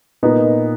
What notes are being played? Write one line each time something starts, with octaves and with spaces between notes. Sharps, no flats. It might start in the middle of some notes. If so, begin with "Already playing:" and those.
A#2 B3 D#4